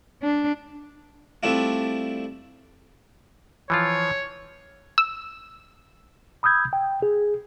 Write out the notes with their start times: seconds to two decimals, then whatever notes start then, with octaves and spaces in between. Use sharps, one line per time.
0.22 D4
1.43 G3 A3 C4 D4 E4 F4
3.70 E3 F3 F4 C#5
4.98 E6
6.43 B5 D#6 E6 G6 G#6
6.73 G5
7.02 G#4